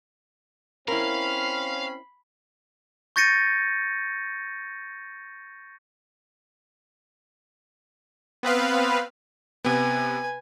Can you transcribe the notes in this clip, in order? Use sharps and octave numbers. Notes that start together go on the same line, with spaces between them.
C4 C#4 E4 A#4 F5 B5 C7
C#6 G6 A6 A#6 C#7 D#7
B3 C4 B4 F5
C3 B3 B4 G#5